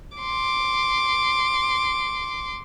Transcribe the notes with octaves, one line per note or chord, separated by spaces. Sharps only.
C6 D6